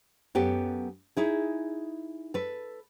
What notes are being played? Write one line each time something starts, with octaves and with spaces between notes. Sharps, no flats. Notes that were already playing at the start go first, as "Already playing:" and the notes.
F#2 B3 G4 A4
D#4 E4 G#4
A4 B4